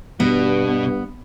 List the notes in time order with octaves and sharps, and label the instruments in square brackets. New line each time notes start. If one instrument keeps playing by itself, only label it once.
[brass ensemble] G2 [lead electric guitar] B2 [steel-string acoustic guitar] B3